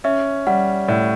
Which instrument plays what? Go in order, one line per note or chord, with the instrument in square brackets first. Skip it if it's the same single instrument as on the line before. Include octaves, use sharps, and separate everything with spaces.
[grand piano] C#4 [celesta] E5
[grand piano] G3 [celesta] F#5
[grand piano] A2 [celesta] D5